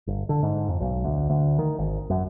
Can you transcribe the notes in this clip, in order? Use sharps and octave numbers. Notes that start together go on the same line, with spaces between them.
G1
D3
G#2
F2
B1
D2
D2
D#3
G#1
F#2